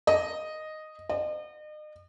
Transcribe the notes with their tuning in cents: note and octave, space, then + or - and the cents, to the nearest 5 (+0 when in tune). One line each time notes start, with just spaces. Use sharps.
D#5 -5
D#5 -40